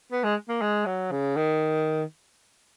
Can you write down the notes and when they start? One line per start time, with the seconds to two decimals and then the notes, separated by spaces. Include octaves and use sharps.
0.12 B3
0.24 G#3
0.49 A#3
0.62 G#3
0.86 F#3
1.11 C#3
1.36 D#3